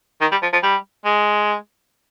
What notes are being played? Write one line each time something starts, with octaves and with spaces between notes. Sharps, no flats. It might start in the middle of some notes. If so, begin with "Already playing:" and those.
D#3
G3
F3
F3
G3
G#3